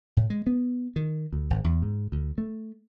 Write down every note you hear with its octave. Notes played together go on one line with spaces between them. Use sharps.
A2
G#3
B3
D#3
D2
G#1
E2
G#2
D2
A3